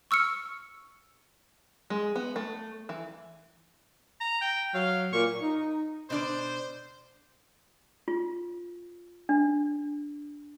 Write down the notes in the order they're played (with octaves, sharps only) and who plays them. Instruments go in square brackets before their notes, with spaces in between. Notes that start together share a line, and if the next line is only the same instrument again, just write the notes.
[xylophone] C#6 E6 F6 C#7
[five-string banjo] G#3
B3
A3
E3
[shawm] A#5
G5
[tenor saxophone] F#3 [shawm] F5
[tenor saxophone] A#2 [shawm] C#6
[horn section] D#4
[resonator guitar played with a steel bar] B2 D4 D5 [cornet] C5
[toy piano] F4
D4